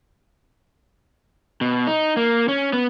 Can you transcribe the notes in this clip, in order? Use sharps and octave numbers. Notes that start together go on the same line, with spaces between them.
B2
D#4
A#3
C#4
B3